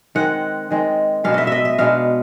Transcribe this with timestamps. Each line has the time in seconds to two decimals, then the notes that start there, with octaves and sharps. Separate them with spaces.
0.15 D#3 G#3 C4 F#5
0.70 D#3 G#3 C4
1.24 B2 G#3 B3 D4 F5
1.34 D#5 E5
1.47 D#5 E5
1.65 E5
1.78 B2 G#3 B3 D4 F5